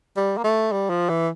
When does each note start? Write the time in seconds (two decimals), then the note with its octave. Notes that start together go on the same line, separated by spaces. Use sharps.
0.16 G3
0.38 A#3
0.44 A3
0.72 G3
0.90 F3
1.09 E3